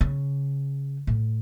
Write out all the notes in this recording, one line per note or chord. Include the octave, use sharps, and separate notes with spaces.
C#3
A2